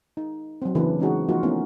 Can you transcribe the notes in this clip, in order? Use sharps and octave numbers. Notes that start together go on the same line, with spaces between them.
D#4
F#3 C4
C#3 E3 A#3 D4 B4
G#3 C4 C#4 D#4 F#4 G#4
F3 A#3 D#4 F4 F#4 A#4
A3 B3 C#4 D#4 E4